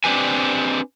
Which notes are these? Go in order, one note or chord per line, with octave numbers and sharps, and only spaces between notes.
C4 D4 D#4 G4 B4 G#5